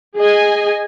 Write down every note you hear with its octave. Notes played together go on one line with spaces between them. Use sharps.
G#4 D#5 G#5